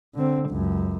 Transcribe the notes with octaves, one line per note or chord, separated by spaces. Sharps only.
D3 C4
C#2 F#2